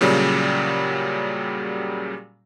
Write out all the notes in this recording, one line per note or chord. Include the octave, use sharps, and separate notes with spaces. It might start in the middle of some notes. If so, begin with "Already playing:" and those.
A#2 C#3 F#3 G3